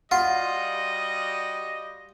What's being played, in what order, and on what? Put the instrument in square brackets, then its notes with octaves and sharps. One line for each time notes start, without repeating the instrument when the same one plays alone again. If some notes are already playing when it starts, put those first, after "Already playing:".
[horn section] G3 F#4 [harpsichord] F4 [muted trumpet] D#5 [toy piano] F#5